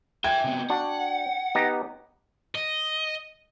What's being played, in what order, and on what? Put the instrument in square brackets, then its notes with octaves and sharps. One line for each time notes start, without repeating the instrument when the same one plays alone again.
[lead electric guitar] E5 G#5 [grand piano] G5 G#6
[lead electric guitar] C3 B3
[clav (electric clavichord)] D4 F#4 [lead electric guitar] F#5
[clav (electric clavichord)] B3 D#4 G4
[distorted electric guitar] D#5